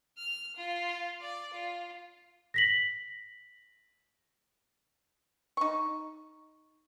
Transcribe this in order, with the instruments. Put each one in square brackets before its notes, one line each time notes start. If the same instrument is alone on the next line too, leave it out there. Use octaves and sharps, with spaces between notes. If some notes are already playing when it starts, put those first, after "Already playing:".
[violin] F6
F4
D5
F4
[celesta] A#6 B6 F#7
[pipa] D#4 C#6